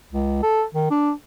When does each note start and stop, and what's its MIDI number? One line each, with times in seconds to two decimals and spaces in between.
0.12 0.41 37
0.43 0.64 69
0.75 0.87 51
0.91 1.11 62